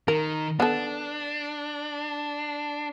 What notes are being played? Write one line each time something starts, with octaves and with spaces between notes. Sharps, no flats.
D#3 A#4
B3 D4 A4